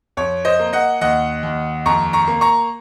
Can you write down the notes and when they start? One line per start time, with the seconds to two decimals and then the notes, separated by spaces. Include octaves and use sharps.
0.17 F2 C#5
0.45 C5 D#5
0.60 A#3
0.73 D#5 F#5
1.01 D#2 D#5 F#5
1.43 D#2
1.86 F2 A#5 C#6
2.13 A#5 C#6
2.28 A#3
2.41 A#5 C#6